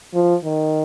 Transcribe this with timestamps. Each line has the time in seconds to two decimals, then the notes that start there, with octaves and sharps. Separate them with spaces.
0.14 F3
0.44 D#3